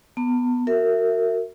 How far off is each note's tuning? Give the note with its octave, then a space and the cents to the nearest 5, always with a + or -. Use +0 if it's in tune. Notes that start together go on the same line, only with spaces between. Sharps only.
B3 +0 A5 +40
F#4 +0 A#4 -30 E5 +0